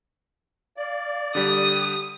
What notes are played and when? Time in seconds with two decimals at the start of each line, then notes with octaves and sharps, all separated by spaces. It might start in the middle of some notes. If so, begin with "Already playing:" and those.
0.77 D5 F5
1.35 D3 G3 G4 D#6